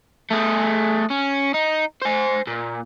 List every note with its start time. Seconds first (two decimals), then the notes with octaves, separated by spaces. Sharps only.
0.31 A3 G#4
1.10 C#4
1.54 D#4
2.02 C5 G#5
2.47 A#2